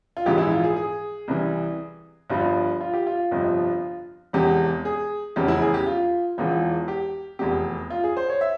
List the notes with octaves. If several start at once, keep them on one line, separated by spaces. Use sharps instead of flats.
F4
A#1 G#2 E3 G4
E4
F4
G#4
G#4
C2 C3 E3
G1 G2 F3 F4
F4
G4
F4
G1 F2 C3 F3
E1 E2 C3 G4
G#4
F1 E2 C#3 G4
E4
G#4
G4
F4
E1 E2 E3 F4
G4
F1 E2 C3 G4
F4
G#4
C5
C#5
E5